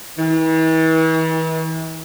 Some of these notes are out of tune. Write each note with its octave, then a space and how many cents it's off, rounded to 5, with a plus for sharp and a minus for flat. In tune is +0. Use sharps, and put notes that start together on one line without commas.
E3 -40